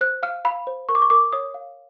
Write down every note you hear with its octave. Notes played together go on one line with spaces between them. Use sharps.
C5 F#6
F5 F6
F5 B5
C5
A#4 C#6
D6
C#6
A#4 D6
C#5 D#6
F5